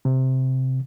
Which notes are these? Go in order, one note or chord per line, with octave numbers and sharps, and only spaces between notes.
C3